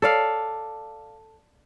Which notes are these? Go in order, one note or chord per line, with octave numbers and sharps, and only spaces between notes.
A4 D5 F5